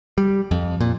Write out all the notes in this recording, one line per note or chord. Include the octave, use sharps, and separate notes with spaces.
G3
F2
A#2